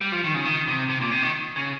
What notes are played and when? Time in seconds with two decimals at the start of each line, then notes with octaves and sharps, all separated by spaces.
0.01 G3
0.12 F3
0.24 D#3
0.35 C#3
0.45 D#3
0.68 C3
0.90 C3
1.01 A#2
1.12 C3
1.23 D#3
1.56 C#3